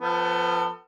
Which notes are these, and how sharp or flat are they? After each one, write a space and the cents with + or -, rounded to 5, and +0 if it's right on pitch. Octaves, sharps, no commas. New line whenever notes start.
F3 +0 B3 +25 A4 +30